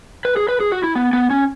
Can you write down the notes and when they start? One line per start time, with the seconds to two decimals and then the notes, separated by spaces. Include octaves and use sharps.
0.25 B4
0.37 G#4
0.48 B4
0.60 G#4
0.72 F#4
0.84 E4
0.95 B3
1.13 B3
1.31 C#4